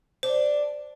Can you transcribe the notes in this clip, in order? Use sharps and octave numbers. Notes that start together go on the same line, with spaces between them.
D4 C5